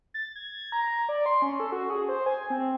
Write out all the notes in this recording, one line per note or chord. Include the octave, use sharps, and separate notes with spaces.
A6
G#6
A#5
D5
C6
C#4
A4
F#4
G#4
C5
G#5
C4